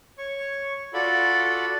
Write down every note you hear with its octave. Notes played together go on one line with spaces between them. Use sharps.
C#5 C#6
F4 F#4 A4 D5 B5